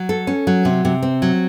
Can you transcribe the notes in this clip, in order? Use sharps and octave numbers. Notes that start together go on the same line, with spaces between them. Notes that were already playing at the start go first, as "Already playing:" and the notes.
Already playing: F#3
A4
C#4
F#3
C3
C3
C4
F#3